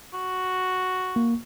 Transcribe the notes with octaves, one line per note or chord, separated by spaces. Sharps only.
F#4
A#3